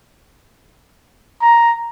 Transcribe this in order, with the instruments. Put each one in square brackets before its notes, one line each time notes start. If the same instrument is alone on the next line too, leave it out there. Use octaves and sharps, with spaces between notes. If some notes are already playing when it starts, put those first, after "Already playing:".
[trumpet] A#5